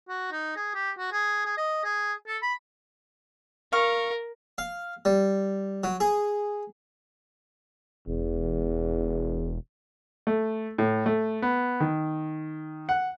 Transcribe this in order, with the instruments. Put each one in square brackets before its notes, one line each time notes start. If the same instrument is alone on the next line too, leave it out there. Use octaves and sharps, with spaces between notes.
[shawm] F#4
D#4
G#4
G4
F#4
G#4
G#4
D#5
G#4
A4
B5
[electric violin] A#4 [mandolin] F5 C#6
[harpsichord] F5
G3
F#3
G#4
[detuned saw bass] E1 [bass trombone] E2
[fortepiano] A3
A2
A3
B3
D#3
F#5